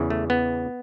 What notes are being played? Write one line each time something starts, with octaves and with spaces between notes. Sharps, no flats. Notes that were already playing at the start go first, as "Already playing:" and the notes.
Already playing: E2 C#3 E3
A3
B3